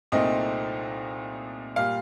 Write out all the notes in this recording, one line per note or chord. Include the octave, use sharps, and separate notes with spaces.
C2 A#2 A3 C4 D#4 D#5
A#2 G3 F5